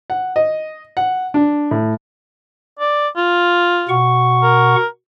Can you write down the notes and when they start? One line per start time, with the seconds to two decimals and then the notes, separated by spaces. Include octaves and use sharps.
0.10 F#5
0.36 D#5
0.97 F#5
1.34 D4
1.71 A2
2.79 D5
3.17 F4
3.89 B2 F#5 C#6
4.43 A#4